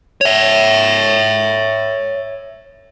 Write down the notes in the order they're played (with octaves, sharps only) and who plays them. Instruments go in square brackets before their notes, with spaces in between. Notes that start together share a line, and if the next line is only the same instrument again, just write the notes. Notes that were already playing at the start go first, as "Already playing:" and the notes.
[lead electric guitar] C#5 E5